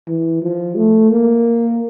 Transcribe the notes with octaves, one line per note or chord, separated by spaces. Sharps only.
E3
F3
A3
A#3